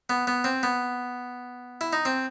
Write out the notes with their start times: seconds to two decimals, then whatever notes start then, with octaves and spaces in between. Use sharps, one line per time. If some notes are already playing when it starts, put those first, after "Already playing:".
0.10 B3
0.27 B3
0.44 C4
0.63 B3
1.81 E4
1.93 D#4
2.05 C4